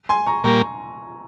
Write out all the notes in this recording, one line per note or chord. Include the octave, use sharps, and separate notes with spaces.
G#5 C6
A#5 C#6
A#2 G3 A#3 A#5 C#6